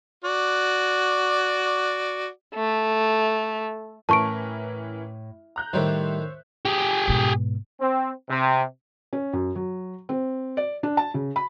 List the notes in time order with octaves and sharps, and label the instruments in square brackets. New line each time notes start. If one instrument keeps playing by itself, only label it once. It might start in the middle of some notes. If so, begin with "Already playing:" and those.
[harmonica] F#4 D5
[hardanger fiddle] A3
[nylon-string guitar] A2 [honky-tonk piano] E3 C#4 A#4 [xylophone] A5 C#6 D7
[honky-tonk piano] A#5 F#6 G6
[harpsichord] A2 D#3 D#4 [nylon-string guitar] G3 [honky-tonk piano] C5 C#5 E5
[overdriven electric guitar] G4 G#4
[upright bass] G#2 B2
[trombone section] C4
C3
[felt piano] C#4
F#2
F#3
C4
D5
D4
A5
C#3
B5